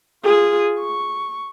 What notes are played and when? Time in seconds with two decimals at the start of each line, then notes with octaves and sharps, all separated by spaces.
0.24 F4 G#4
0.79 C#6